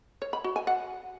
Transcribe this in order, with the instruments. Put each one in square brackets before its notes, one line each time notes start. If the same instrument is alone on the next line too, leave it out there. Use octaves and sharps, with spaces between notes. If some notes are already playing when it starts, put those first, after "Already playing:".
[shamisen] C#5
B5
F#4
G#5
F#5